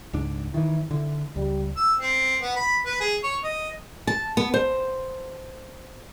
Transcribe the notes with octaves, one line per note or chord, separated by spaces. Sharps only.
C#2 G#2 D4
D#3 E3 E4
D3 E4
C#2 G3
E6
C4
B3
B5
B4
G#4
C#5
D#5
A5
B3
C5